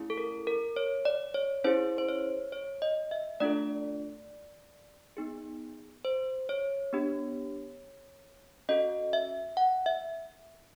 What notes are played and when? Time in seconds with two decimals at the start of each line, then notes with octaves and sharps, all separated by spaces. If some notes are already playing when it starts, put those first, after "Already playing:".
Already playing: A3 C#4 E4 G#4
0.10 A4
0.18 A#4
0.47 A#4
0.76 C#5
1.05 D5
1.34 C#5
1.64 C#4 E4 G#4 C5
1.98 C5
2.09 C#5
2.52 C#5
2.82 D#5
3.11 E5
3.40 A3 D4 F4 A4 D5
5.17 B3 D#4 G#4
6.05 C5
6.49 C#5
6.93 B3 D4 G4
8.69 C#4 F#4 A4 D#5
9.13 E5
9.57 F#5
9.86 E5